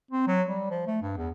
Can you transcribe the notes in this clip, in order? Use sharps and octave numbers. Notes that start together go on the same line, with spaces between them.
C4
F#3
G3
F3
A3
G2
E2